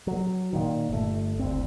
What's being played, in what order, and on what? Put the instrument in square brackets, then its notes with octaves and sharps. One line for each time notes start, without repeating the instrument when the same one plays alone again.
[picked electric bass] F#3
A#2 D#3
G1 A3
F#1 D2 C4